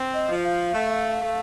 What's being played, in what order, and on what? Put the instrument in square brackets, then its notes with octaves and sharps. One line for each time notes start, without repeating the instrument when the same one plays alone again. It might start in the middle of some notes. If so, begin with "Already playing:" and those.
Already playing: [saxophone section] C4
[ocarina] D#5
[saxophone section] F3
[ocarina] F5
[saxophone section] A3
A3